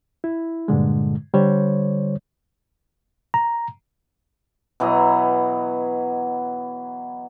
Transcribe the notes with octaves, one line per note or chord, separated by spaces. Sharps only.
E4
G2 A#2 D3 G#3
D3 G3 C5 C#5
A#5
B2 E3 F#3 D#5